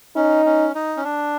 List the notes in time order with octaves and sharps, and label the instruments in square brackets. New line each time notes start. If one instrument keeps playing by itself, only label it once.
[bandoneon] C#4 [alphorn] D#4
[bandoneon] C#4
D#4
C#4
D4